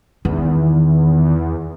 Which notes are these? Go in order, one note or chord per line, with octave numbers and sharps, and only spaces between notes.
E2 D#3